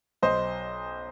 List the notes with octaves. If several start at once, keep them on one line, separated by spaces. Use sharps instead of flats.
B1 C5 D#5